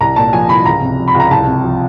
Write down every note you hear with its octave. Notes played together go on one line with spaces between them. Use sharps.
C2 A#5
A#2 A5
F3 G#5
C2 B5
C#2 A#5
C3
F3
B5
C#2
A#5
C2 A5
C3
F3